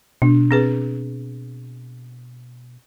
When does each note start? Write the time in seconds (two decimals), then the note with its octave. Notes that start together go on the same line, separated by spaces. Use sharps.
0.22 B2 D4
0.51 C4 G#4 B4